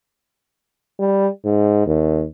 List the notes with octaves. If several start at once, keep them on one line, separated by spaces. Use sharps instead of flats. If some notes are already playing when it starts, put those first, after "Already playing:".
G3
G#2
D#2